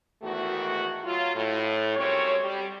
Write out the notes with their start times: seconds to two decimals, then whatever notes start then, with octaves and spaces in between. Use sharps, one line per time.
0.23 E2 G#2 D#3 A3 F#4
1.04 F#3 F4
1.35 A2
1.96 F#2 G3 C4 C#5
2.42 G3